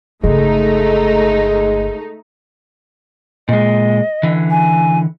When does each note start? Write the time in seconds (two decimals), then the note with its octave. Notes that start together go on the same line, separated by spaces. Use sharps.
0.24 G1 C#3 G#3 A3 D#4
3.49 A#2 G#3 D#5
4.23 D3 E3
4.50 G#5